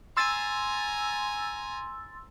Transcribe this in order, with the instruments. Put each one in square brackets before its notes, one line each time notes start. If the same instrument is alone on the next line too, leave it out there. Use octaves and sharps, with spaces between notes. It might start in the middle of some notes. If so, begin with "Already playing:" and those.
[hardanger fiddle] G#5 A#5 [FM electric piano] C6 E6 A6